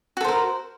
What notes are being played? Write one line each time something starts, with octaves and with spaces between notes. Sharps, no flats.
F#4 A4 A#4 C5